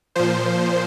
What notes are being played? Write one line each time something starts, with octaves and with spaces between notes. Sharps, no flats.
A#2 F3 C5